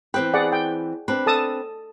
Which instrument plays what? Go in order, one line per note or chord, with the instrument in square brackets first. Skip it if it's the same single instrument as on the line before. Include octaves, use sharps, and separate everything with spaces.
[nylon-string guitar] E3 C4 B4 [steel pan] G5
[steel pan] G#4 D5 F#5
G5
[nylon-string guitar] C4 D4 B4
[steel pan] A4 A5 D#6